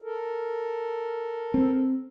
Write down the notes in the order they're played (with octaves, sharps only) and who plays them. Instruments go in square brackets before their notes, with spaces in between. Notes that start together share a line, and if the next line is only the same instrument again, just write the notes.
[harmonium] A4 A#4
[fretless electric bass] C4